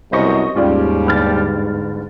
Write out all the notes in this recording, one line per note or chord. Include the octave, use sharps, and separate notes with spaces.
C2 F#2 B2 C5 D#5 C#6
D#2 G#2 G3 C#4 F4 D5
G1 F6 A6